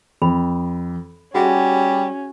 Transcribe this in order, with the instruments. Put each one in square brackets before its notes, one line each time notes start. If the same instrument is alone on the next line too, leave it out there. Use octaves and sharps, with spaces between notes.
[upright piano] F2 [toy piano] B5
[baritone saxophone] G3 [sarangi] C#4 [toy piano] F#4 G#4 E5 [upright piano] F#5